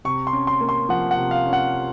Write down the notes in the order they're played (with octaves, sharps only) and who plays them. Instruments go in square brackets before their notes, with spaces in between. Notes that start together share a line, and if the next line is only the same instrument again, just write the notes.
[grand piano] C3 C#6
C6
C#4
C6
A#3
C6
F3 F#5
F#5
C3
F5
C#4
F#5